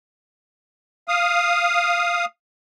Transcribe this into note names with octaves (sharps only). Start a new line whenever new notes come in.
F5 D#6